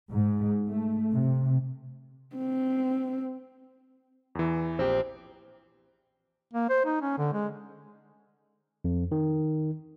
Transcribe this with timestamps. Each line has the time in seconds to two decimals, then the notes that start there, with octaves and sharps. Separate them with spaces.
0.11 G#2
0.67 A3
1.14 C3
2.36 C4
4.35 E2 E3
4.79 A#1 C4 G4
6.54 A#3
6.69 C5
6.85 D#4
7.01 C#4
7.18 D3
7.33 G#3
8.85 F2
9.12 D#3